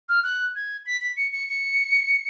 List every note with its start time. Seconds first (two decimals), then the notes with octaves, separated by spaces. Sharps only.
0.09 F6
0.24 F#6
0.56 G#6
0.86 B6
1.01 B6
1.17 C#7
1.33 C#7
1.49 C#7